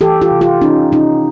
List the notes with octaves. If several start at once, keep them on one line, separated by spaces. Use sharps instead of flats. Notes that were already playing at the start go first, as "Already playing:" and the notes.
E3 G4 A4
F4 G4
C3
F4 G4
E3 C#4 D#4
C3 C#4 D#4